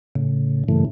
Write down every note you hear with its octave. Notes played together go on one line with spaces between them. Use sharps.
A2 C#3
G2 A#2 C#3 E3 A3